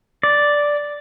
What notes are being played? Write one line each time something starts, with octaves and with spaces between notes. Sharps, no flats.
D5